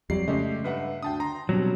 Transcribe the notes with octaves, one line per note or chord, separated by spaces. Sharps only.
F2 F#3 G3 G4 D5 C7
C#3 G#3 A3 G4 D#5
G2 B4 E5 F#5
D2 D3 G5 A5 D#6
A#5 C6
B2 F#3 G3 C4 D4